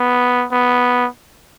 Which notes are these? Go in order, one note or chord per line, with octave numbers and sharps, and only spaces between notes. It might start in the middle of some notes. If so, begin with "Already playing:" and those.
Already playing: B3
B3